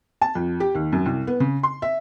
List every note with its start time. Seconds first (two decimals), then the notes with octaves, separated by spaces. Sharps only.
0.21 A5
0.35 F2
0.60 G4
0.75 D#2
0.92 F#2
1.06 C2
1.27 B3
1.40 C#3
1.63 C6
1.82 E5